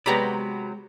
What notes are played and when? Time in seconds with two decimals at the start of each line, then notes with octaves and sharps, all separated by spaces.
0.06 C3 F#3 G#3 B3 G4 D5 A#5 B5